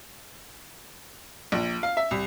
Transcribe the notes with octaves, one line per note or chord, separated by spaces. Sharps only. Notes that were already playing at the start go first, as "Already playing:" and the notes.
A#1
F5
E5
C2